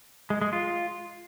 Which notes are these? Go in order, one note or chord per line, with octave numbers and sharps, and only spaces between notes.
G#3
G#3
F4